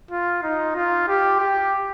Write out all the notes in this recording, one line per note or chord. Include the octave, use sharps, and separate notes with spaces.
F4
D#4
F4
G4
G4